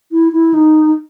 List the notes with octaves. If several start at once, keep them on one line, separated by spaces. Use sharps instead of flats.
E4
E4
D#4